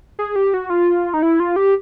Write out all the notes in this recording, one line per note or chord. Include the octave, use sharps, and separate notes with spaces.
G#4
G4
F#4
F4
D#4
E4
F4
G4